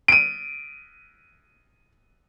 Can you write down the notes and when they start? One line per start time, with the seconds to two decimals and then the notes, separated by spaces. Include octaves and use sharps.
0.08 D7 D#7